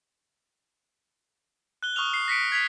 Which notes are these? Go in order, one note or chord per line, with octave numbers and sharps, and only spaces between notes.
F#6 G7
C#6 D#6 F6 F7
C7
A#6 B6 C#7 D7
G#6 B6 F7